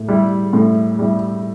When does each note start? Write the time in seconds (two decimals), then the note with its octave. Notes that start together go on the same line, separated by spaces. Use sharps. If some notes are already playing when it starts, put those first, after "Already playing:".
Already playing: A2
0.08 G3 E4
0.53 A2
0.99 G3 E4